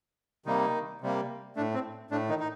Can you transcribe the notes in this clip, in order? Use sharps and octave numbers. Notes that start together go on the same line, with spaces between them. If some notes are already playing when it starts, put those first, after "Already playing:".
C3 D#3 G3 A#3 D#4
C3 G3 A#3
A2 A3 D4
C4
A2 A3 D4
D#3 D#4
D#4